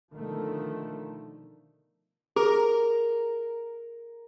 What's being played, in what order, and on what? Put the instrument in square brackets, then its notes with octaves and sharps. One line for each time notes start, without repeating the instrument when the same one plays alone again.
[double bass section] B2 D3 D#3 F3 A3
[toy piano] G#4 [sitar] A#4